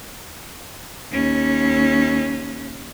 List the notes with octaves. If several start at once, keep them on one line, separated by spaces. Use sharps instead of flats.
D#2 C#4